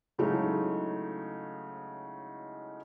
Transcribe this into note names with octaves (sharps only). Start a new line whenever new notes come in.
A2 C#3 F#3 G#3 A3 D#4